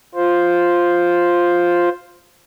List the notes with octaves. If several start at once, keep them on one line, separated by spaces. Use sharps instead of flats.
F4 C5